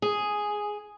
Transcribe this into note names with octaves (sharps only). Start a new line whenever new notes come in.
G#4